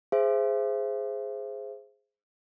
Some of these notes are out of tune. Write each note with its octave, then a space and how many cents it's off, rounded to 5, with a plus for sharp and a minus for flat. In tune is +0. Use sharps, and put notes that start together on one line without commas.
G#4 +0 C5 +0 E5 +30